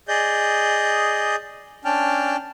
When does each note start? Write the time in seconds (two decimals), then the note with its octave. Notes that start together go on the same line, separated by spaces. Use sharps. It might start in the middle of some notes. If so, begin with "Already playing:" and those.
0.08 G#4 D5 D#5 G6
1.85 C#4 D4 G5 A5 F6